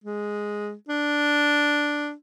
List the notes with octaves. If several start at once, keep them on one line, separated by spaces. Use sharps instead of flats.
G#3
D4